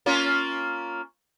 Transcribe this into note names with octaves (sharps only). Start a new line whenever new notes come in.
A#3 C#4 F4